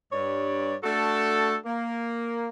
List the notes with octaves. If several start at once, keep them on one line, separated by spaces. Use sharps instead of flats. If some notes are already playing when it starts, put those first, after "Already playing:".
G2 C#5 D5
A3 D4 F#4 A4
A#3